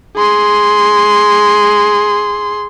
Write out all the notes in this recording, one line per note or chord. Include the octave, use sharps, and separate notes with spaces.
G#4 C6